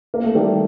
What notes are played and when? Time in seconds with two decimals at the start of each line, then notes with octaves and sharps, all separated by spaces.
0.14 A#3
0.24 A3
0.35 D#3 G3